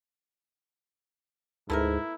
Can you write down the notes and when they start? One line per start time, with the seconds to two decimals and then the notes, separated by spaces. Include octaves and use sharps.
1.70 D2 G#2 A3 B3 E4 A#4